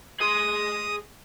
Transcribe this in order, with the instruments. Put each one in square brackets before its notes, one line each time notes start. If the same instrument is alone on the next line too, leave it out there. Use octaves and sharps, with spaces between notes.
[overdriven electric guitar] G#4 C6 [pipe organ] D#6